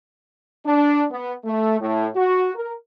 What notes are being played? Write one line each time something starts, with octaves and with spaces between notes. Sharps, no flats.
D4
B3
A3
A2
F#4
A#4